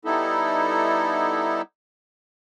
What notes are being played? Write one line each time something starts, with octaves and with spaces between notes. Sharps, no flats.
G3 B3 D#4 E4 A4